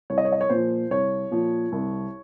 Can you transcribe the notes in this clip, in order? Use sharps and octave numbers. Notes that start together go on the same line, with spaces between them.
C2 C#5
D#5
C#5
D#5
C#5
A#2 F3 C5
C2 C#5
A#2 F3
C2